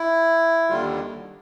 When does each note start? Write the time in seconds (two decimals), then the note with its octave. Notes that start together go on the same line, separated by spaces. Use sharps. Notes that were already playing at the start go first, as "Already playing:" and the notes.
Already playing: E4
0.69 D#2 D3 G3 F4